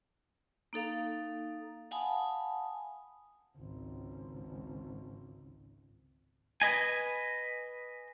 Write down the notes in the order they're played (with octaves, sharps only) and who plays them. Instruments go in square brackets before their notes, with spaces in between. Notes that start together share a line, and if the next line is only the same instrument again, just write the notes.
[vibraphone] A#3 D#4 A4 F5
F5 F#5 G#5 A5 B5 D#6
[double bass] G#1 C#2
[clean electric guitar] B4 D#5 G#5